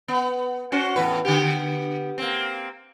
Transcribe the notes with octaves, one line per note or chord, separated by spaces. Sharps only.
B3
C#4 F#4 C5
E2 A2 B4
D3 B3 G4
A#3 C4